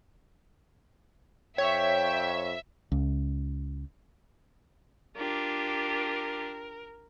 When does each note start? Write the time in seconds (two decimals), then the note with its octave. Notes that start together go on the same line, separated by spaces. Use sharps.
1.58 F2 C#5 E5 G5
2.92 C#2
5.17 D4 F4 G4 A#4